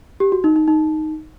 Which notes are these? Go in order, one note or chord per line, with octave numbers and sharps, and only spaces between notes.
G4
F#4
D#4
D#4
D#4